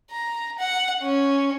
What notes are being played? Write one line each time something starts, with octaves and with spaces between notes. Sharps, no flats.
A#5
F#5
C#4